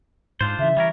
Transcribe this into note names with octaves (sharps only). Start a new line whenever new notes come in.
G#2 D4 F4 C5
C#3 E3 E5
E3 G3 C#4 A#4